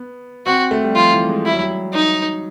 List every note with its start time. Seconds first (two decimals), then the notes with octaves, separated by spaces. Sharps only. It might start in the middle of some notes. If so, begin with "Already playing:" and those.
Already playing: B3
0.46 C4 F#4
0.71 A3
0.84 G3
0.95 F3 F4
1.13 E3
1.29 G#3
1.45 G3 E4
1.53 F#3
1.61 G3
1.94 D#4